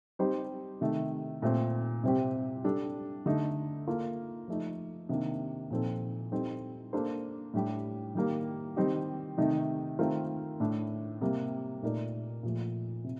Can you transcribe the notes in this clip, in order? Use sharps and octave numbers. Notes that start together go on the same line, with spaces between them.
G3 C4 D#4 G4 C5
C3 D#3 A3
A#2 A3 C4
C3 G3 C4 G4
G3 D4 A4
D3 A3 D#4
A#3 F4 A4
F3 A3 D#4
C3 D#3 A#3 D4
A#2 F3 C4 D#4 A4
G3 C4 D#4 A4
A#3 D4 A4 C5
A2 G3 D4 G4
D#3 G3 A#3
D#3 G3 C4 D#4 G4
C3 D#3 A3 D#4
D#3 A3 C4 F4 A#4
A2 A3 D4
C3 G3 A#3
A#2 A3 D#4 A#4 D5
A#2 F3 A3
C3